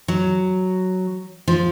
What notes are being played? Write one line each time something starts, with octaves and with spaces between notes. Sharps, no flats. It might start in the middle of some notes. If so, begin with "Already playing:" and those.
F#3
F3